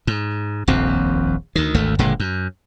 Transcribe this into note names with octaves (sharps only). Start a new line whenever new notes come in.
G#2
D#1 A#1 F2 C4
D2 D#3
G#1 D2 A3
F#1 A#2 D3 G#3
F#2